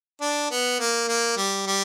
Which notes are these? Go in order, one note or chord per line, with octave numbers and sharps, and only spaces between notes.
D4
B3
A#3
A#3
G3
G3